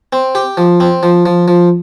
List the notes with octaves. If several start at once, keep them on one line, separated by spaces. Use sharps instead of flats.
C4
G4
F3
C4
F3
F3
F3